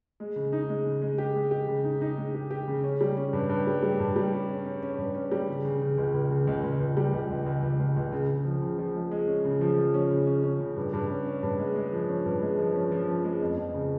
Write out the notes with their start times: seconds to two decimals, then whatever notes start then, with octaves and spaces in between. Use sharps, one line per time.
0.20 G#3
0.36 C#3
0.53 D#4
0.69 G#3
0.85 C#3
1.02 G#3
1.18 G4
1.35 G#3
1.51 G4
1.68 C#3
1.84 D#4
2.01 D#4
2.17 G#3
2.34 G4
2.51 G4
2.68 C#3
2.84 C#4
3.01 G3
3.17 C#4
3.33 G2
3.49 G2
3.67 G3
3.82 G3
4.00 G2
4.16 G3
4.32 C#4
4.49 C#4
4.66 C#4
4.83 C#4
4.98 G2
5.15 C#4
5.32 G3
5.48 C#3
5.65 C#3
5.81 C#3
5.98 C#2
6.14 C#2
6.31 C#3
6.47 C#2
6.63 C#2
6.80 C#2
6.97 G3
7.13 C#2
7.30 C#2
7.46 C#2
7.63 C#2
7.79 C#2
7.96 C#2
8.12 C#3
8.30 C#3
8.45 F3
8.62 C#3
8.78 F3
8.95 G#3
9.12 G#3
9.28 C#4
9.45 C#3
9.61 F3
9.78 F3
9.94 C#4
10.10 C#3
10.27 C#4
10.44 C#4
10.60 C#3
10.76 G2
10.93 G2
11.10 C#4
11.27 C#4
11.43 G2
11.59 G#3
11.76 G#3
11.93 F3
12.09 C#4
12.26 G2
12.42 G#3
12.59 F3
12.75 C#4
12.92 F3
13.08 C#4
13.24 G#3
13.41 F2
13.58 F2
13.74 C#3